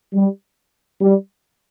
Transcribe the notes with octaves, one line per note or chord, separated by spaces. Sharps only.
G3
G3